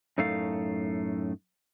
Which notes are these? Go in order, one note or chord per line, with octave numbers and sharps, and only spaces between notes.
F#2 A2 A3 D#4 A4 F5